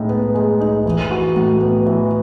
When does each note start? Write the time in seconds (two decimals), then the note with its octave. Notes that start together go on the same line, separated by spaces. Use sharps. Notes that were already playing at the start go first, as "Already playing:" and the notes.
Already playing: A2 G#3 D#4
0.09 B3
0.35 G#3
0.61 D#4
0.86 E3
1.11 F#4
1.36 A2
1.61 B3
1.86 E3